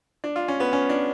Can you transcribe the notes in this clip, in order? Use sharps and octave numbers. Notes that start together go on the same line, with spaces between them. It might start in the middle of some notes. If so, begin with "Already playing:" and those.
D4
F4
C#4
B3
C#4
D4